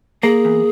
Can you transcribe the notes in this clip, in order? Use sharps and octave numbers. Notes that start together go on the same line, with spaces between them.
A#3 G#4
E2